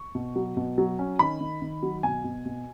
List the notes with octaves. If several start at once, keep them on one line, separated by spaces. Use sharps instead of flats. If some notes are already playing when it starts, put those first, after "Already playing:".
Already playing: C#6
B2
F#3
B2
F#3
C#4
D#3 B5
D#3
D#3
F#3
B2 G#5
B2
B2